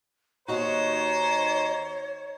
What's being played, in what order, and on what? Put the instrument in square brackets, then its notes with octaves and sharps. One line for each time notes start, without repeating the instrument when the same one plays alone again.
[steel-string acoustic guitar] D#2 D#4 F#4 [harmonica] C5 [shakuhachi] C#5 [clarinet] A#5